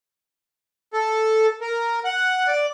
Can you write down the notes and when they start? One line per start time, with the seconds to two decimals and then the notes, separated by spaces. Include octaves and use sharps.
0.93 A4
1.61 A#4
2.05 F#5
2.48 D5